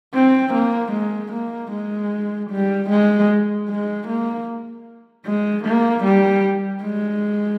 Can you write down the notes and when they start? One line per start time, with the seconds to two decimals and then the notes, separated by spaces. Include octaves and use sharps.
0.14 C4
0.53 A#3
0.92 G#3
1.33 A#3
1.72 G#3
2.51 G3
2.90 G#3
3.69 G#3
4.08 A#3
5.26 G#3
5.65 A#3
6.05 G3
6.83 G#3